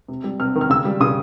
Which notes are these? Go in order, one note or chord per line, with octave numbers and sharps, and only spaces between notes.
C3
G3
C3 F6
D#3
F6
C#3 E6
G3
C#3 D#6